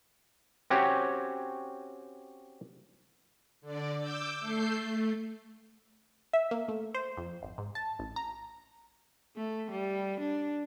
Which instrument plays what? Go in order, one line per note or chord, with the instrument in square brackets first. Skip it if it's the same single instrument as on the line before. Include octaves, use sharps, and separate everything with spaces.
[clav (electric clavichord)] C4 C#4 F#4 G4 C#5
[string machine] D3 D5
D6 E6 G6
A3 A4 G6 C7
A3
[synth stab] E5
A#3
A3
C5
F2
G#1
G#2
A5
A1
A#5
[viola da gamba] A3
G3
D4